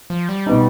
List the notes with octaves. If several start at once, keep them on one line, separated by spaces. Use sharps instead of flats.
F3
G3
B2 B3 D#4